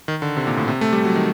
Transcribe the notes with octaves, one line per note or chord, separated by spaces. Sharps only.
D#3
D3
C3
A#2
A2
C3
A3
G3
F#3
D#3